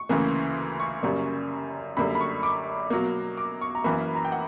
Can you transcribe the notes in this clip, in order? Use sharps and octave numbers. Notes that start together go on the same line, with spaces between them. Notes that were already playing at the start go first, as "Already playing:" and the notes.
Already playing: C#6
D2 C#3 E3 A#3
C#6
F#2 C#3 G3 A#3
F#2 D3 G3 A#3 B5
B5
C#6
D6
B2 F#3 A#3
D6
C#6
A#5
F#2 E3 A#3 B5
A#5
G5
F#5